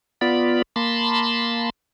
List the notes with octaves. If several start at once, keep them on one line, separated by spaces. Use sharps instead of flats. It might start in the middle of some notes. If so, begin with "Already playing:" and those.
B3 F4 D5 B5
A#3 A5 B5 C6